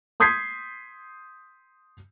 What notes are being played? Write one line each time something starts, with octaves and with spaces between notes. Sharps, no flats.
C6 D#6 G6 G#6 B6 C7